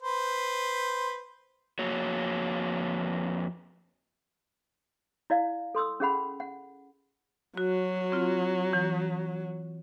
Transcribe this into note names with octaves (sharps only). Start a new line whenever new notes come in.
B4 C5
F2 A#3 F#4 C#5
E4 D5 F5
A4 C6 D#6 E6
C#4 G#4 F#5 B5
F#5
F#3 F#4
C4 F4
E3